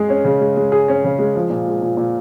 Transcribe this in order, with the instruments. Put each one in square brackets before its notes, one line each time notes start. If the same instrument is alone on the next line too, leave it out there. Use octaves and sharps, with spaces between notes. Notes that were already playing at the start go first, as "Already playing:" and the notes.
Already playing: [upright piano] G#3 G#4
C#4
C#3
G#3
G#3
G#4
C#4
C#3
G#3
F3
A#2
G#3
A#2
A#2